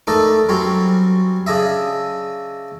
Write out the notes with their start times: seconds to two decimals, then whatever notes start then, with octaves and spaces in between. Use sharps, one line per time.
0.07 A3 D4 D#4 A4 A#4
0.49 F#3 G3 C4 C#4
1.46 C#3 D4 D#5 E5